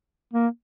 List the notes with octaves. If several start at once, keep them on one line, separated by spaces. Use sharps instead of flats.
A#3